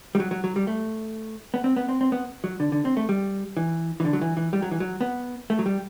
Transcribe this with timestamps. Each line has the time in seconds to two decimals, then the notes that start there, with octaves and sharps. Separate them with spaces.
0.15 G3
0.20 F#3
0.31 F#3
0.44 F#3
0.56 G3
0.67 A3
1.54 B3
1.64 C4
1.76 B3
1.89 C4
2.01 C4
2.12 B3
2.44 F#3
2.60 D3
2.72 D3
2.85 C4
2.97 A3
3.09 G3
3.57 E3
4.00 E3
4.05 D3
4.13 F#3
4.21 E3
4.37 E3
4.53 G3
4.62 F#3
4.71 E3
4.80 F#3
5.01 B3
5.50 A3
5.59 F#3
5.66 G3